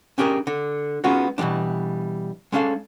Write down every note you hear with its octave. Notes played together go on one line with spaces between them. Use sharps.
C#4 D4 G4 G#4 A#4
D3
G#3 B3 C#4 D#4 F4 F#4
B2 E3 G3 G#3 D4
G#3 C#4 D4 A4 F5